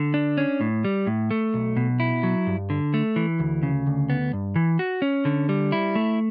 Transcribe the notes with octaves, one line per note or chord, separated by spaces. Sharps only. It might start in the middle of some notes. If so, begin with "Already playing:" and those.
Already playing: D3
D4
C#4
A2
G3
A2
A3
B1
B2
E4
F#3
G2
D3
A3
E3
D2
C#3
D2
B3
G2
E3
F#4
C#4
D3
G3
E4
A3